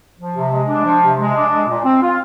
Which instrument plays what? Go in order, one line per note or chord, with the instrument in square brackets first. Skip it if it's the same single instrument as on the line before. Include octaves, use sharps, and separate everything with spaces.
[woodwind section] F3
C3
G#3
D4
F3
C3
G#3
D4
G#3
A#2
C4
F4